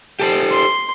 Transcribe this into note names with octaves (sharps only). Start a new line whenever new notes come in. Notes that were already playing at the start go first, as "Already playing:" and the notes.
G4 A4 C5
C6